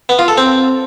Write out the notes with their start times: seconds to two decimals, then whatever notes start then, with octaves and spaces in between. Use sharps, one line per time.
0.09 B3
0.19 F4
0.28 A4
0.38 C4